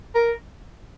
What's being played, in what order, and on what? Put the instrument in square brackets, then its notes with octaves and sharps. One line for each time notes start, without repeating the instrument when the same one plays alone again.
[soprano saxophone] A#4